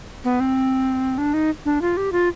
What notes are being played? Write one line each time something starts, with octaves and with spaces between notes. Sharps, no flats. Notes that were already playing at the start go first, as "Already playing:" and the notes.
B3
C4
D4
D#4
D4
F4
G4
F4